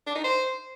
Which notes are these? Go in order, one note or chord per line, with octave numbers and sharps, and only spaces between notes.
D4
D#4
C5